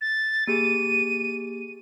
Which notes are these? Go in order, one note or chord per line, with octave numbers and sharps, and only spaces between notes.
A6
A#3 G4 G#4 D#7